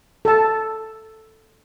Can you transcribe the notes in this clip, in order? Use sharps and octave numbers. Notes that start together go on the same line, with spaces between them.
A4 A5